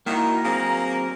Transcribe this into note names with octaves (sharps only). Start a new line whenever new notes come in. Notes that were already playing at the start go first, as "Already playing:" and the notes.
D#3 A#3 E4 F#4 A#5
F#3 A#3 C4 G#4